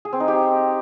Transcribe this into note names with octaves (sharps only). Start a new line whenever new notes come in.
G#4
C4
D#4
G4